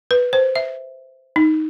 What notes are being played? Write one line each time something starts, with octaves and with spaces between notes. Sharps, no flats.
B4
C5
E5
D#4